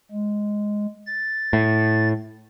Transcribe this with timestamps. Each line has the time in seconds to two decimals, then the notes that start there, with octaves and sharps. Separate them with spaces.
0.12 G#3
1.07 A6
1.53 A2